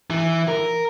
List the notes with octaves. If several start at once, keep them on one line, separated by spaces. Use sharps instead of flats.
E3
A#4